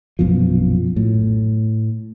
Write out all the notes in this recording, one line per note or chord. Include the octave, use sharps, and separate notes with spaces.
A#1 F#2 B2 F3
A2